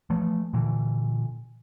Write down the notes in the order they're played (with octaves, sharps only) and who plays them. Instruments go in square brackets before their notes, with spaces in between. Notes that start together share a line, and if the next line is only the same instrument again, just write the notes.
[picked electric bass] E3 F3 A3
A#2 D3 E3